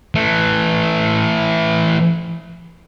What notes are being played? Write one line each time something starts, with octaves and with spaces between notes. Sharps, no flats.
E3 A3